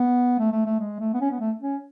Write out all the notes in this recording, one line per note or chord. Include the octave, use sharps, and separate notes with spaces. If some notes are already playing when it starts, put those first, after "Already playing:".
Already playing: B3
A3
A3
A3
G#3
A3
B3
C#4
B3
A3
C#4